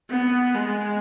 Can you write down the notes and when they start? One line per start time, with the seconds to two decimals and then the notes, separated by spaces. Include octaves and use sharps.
0.10 B3
0.54 G#3